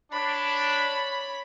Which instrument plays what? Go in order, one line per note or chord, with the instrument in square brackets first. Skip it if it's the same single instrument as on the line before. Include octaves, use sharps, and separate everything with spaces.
[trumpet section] D4 [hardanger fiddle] C#5 B5